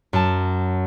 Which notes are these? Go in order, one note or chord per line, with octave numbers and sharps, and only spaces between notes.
F#2 A5